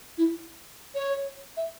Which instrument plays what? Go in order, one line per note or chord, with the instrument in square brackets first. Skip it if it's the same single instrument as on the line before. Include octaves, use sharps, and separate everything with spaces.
[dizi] E4
C#5
E5